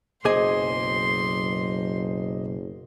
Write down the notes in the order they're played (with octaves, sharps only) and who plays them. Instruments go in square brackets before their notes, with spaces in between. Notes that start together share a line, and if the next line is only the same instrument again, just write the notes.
[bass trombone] F#1 [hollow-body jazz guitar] B1 G#4 G#5 [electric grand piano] C5 D#5 D6 [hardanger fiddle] C6